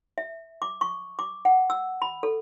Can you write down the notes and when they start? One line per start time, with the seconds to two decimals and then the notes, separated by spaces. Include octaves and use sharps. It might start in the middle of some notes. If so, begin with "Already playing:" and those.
0.18 E5
0.62 D6
0.81 C#6
1.19 D6
1.45 F#5
1.70 E6
2.02 B5
2.23 A4